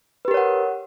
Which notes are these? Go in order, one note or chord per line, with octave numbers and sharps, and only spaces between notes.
G4 A#4 B4 C#5 F#5